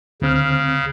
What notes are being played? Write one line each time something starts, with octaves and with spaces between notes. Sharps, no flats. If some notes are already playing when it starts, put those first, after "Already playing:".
D2 C#3 C4 F6